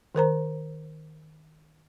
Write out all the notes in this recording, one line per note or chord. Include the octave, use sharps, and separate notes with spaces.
D#3 A#4 C5 A#5